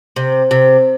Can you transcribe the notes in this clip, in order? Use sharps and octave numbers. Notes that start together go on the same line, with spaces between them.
C3
C3